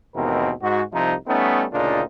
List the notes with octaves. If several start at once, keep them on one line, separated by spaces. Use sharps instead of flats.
D#2 G#2 B2 E3 C4 A#4
G#2 F#4
C2 C3 F3 D#4
G3 A3 B3 C#4 D#4
D2 A#2 C#3 D4 D#4 F4